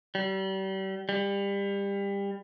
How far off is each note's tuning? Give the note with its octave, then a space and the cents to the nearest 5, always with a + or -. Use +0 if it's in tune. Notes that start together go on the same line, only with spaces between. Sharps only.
G3 -35
G3 +25